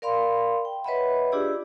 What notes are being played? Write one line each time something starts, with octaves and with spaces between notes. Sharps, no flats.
A#4 D5 F5 B5 C6
G5
B4 C#5 D#5 E5 F#5 B5
D4 F4 G4 G#4 D5 E6